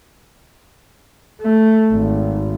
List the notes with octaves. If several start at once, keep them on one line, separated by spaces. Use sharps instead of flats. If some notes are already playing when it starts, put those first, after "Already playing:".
A3
G#1